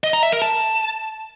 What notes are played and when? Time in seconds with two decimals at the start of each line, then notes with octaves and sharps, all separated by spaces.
0.04 D#5
0.13 A#5
0.23 E5
0.32 A#4
0.42 A5